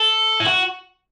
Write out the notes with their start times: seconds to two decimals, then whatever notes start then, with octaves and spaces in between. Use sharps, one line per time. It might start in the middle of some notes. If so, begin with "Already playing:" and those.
Already playing: A4
0.40 E4
0.46 F#4